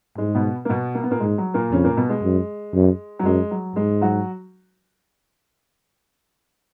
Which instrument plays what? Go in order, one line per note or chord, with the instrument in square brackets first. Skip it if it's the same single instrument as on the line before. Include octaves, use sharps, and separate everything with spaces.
[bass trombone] G#2 [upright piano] G#3
[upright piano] B2 B3
A#3
B2 B3
A#3
B3
A#2 A#3
[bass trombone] G#2 [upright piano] G#3
[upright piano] F#3
A#2 A#3
[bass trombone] F2 [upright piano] C#3 C#4
[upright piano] A#2 A#3
B2 B3
G#3
[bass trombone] F#2
F#2
[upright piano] F#3
[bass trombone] F#2 [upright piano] G#3
[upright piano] F#3
[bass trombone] G#2 [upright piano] G#3
[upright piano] F#3 F#4